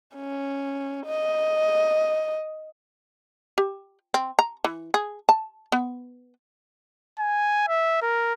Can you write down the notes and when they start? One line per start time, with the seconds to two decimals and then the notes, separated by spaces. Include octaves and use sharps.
0.16 C#4
1.06 D#5
3.58 G4
4.14 C4
4.39 A#5
4.64 E3
4.94 G#4
5.29 A5
5.72 B3
7.19 G#5
7.68 E5
8.02 A#4